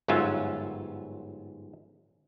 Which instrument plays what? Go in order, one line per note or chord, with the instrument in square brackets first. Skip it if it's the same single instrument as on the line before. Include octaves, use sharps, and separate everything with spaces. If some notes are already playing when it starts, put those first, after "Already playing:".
[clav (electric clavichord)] G1 G#2 F#3 C#4 F4 E5